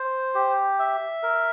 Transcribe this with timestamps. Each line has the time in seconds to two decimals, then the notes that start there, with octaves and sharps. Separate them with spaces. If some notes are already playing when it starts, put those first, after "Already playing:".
Already playing: C5
0.35 G4
0.79 E5
1.23 A#4